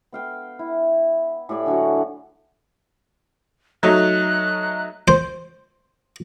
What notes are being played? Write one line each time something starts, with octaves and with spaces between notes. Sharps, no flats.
B3 F5 G5
E4
A2 G4 D5 G#5
D3 F#3 F#4
F#3 A3 D#4 F#6
C5